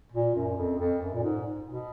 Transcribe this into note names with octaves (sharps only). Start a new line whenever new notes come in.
A#2
F#2
F2
F2
F#2
A#2
G#2
B2